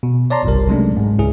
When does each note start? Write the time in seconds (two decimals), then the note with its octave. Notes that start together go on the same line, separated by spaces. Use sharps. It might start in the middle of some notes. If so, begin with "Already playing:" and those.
0.03 B2
0.30 C#5 D5 A5 A#5 C6
0.45 G1 C2 G3 A#4
0.69 C3 F#3 G#3 A3 C#4 D4
0.97 G#2 G#3
1.19 C#2 E4 G#4